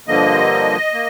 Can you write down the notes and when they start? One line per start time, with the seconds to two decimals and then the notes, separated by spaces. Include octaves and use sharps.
0.08 G2 D3 F3 A#3 D#5
0.94 A#3